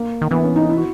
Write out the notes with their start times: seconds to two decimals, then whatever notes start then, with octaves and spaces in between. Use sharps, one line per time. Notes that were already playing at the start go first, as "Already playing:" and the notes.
Already playing: A#3
0.21 D#3
0.31 E3 B3
0.43 C#4
0.56 D#4
0.69 E4
0.77 F#4